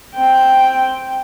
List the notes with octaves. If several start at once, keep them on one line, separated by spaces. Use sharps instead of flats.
C4 G5